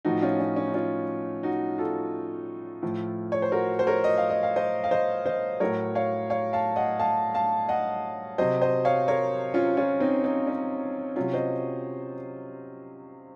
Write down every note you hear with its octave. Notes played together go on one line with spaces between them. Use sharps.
A2 F3 D#4 F#4
C#4 F4
C#4
C#4
D#4
C#4 F4
D#4 F#4
F4 A4
A2 F3
C#5
C5
F#4 A#4
C5
A#4 C#5
D#5
F5
D#5
F5
C5 D#5
F5
C5 D#5
C5 D#5
A2 F#3 A#4 C#5
C#5 F5
C#5 F5
F5 A5
D#5 F#5
F5 A5
F5 A5
D#5 F#5
C3 F#3 C5 D#5
C5 D#5
C#5 F5
A#4 C#5
C#4 F4
C#4 F4
C4 D#4
C4 D#4
C#4
C3 F#3 C#4 F4
C5 D#5